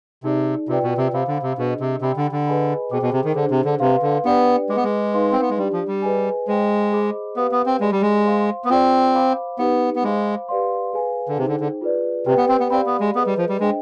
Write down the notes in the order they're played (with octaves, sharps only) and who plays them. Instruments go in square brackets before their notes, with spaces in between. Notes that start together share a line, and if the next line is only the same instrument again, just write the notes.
[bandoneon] C3 [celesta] D#4 G#4 D5
[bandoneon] C3 [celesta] F4 B4 D5 G5
[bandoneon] B2
C3
[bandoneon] C3 [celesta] C5 F5 B5 D6
[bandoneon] D3
C3
[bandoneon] B2 [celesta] D4 G#4 C5 D#5
[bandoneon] C3
[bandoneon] C3 [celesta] G4 D5 G5 B5
[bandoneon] D3
D3
[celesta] G#4 B4 D#5 G#5 B5
[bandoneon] B2 [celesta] G#4 C5 G5 B5 D6
[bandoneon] B2
C3
D#3
[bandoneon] D3 [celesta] D4 G#4 C5
[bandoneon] C3
D3
[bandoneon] C3 [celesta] B4 F5 C6
[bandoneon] D3
[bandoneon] B3 [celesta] D4 G4 B4 D5 G5
[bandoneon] G#3 [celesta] G#4 B4 D#5 B5 D6
[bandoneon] B3
G#3
[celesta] D#4 B4 F5 C6
[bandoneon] C4
B3
G#3
[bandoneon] G3 [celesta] D4 G4 D5
[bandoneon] F3
G3
[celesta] G#4 B4 D#5 G#5
[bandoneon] G#3 [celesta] C5 D#5 G5
[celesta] G#4 C5 D#5 B5 D6
[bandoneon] B3 [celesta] G4 B4 F5
[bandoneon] B3
C4
[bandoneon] G#3 [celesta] G4 D5 G#5 B5
[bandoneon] G3
G#3
[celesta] C5 F5 C6
[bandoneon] B3
[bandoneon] C4 [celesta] F4 G#4 D5
[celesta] C5 F5 B5 D6
[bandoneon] B3 [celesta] D#4 G4 B4
[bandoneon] B3
[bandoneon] G#3 [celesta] C5 F5 B5 D6
[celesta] G4 B4 D5 F5 C6
G#4 B4 F5 G#5
[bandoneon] D3
[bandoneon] C3 [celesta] D#4 G#4 C5 G5
[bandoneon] D3
D3
[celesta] F4 G#4 B4 D5
[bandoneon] C3 [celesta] G4 B4 D5 G5
[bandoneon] B3
C4
B3
[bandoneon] C4 [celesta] G4 D5 F5 B5
[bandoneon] B3
G#3
[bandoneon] B3 [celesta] G#4 B4 D#5
[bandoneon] G3
F3
G3
[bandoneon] G#3 [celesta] D4 G#4 C5 D#5 G5